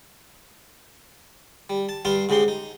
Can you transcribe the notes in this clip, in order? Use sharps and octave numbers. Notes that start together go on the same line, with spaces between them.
G3
A5
G2 G3 F5 A5 C6
G#2 C#3 G#3 G4 C6
D#4